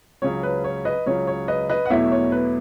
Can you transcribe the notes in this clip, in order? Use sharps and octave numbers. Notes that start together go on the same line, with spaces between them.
C#2 C#3 F#3 C#5
B4
C#5
B4 D#5
C#2 C#3 F#3 C#5
C#5
B4 D#5
B4 D#5
F#5
E2 B2 F#3 A3 E4 C#5 E5
C#5
B4